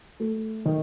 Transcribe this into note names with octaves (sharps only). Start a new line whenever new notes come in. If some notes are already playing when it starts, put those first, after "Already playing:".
A3
D#3